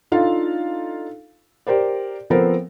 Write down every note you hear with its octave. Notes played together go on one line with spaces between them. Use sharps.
D4 D#4 F4 A4 F5
G4 A#4 C5 D5
F3 B3 C4 A4 A#4 C5